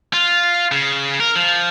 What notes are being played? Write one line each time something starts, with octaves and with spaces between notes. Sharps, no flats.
F4
C#3
A#4
F3